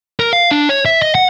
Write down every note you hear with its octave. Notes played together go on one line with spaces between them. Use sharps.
A#4
F5
D4
C#5
E5
D#5
F#5